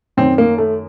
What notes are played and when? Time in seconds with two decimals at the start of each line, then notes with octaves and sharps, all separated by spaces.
0.17 F#2 D#3 C4
0.38 A#3
0.58 A3